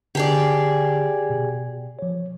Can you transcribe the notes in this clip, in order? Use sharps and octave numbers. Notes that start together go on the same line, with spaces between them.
D3 G4 G#4 D5 A5
B2
F3 C#5